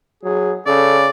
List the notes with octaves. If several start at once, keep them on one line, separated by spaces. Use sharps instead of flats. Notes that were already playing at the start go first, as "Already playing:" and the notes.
F#3 G#4
C#3 A4 D5